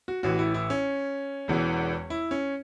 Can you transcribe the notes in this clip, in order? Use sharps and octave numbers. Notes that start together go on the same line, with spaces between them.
F#4
A1 A2 E3 F#4
E4
E4
C#4
E1 E2 E3
E4
C#4